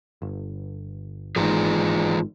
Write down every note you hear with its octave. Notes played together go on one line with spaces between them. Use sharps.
G1
G#1 G#2 E3 F4 G#4